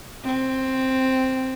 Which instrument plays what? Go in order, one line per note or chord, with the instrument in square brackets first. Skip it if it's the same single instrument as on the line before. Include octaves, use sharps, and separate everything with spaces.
[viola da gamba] C4